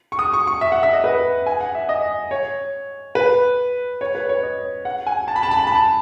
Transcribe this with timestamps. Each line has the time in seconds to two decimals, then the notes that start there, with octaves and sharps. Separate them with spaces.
0.12 C#6
0.19 D#6
0.33 C#6
0.47 C#6
0.61 E5
0.72 F#5
0.83 E5
0.93 D#5
1.04 B4
1.46 G#5
1.61 F#5
1.75 E5
1.89 D#5
2.31 C#5
3.15 B4
4.01 C#5
4.15 B4
4.29 C#5
4.43 D#5
4.85 F#5
5.07 G#5
5.28 A5
5.36 B5
5.43 A5
5.51 B5
5.59 A5
5.67 B5
5.75 A5